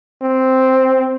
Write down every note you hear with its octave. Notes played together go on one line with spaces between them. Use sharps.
C4